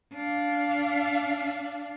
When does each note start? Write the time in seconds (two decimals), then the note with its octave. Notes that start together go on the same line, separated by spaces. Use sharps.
0.13 D4 F5